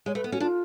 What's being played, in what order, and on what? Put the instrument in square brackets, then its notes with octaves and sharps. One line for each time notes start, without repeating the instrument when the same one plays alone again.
[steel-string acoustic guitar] G#3 [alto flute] C#5
[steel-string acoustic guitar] A3 [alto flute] B4
[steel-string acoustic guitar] B3
[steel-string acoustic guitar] C#4 [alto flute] F#4
[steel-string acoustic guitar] D4 [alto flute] F4